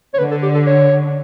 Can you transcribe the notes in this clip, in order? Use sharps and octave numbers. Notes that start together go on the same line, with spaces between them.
C#5
D3 B4
A4
G4
A4
C#5